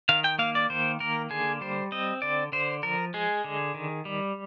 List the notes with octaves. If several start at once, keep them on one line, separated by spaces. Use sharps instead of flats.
D#3 F5
G5
A#3 F5
D5
D#3 C5
A#3 A#4
D3 G#4
G3 C5
C4 D#5
D3 D5
D3 C5
F3 A#4
G#3 G#4
D3
D#3
G3